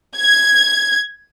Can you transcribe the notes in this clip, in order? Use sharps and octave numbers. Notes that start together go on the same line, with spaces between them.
G#6